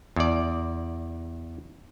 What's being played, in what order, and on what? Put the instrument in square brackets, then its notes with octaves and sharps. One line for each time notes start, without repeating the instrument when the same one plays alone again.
[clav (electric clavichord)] E2 D5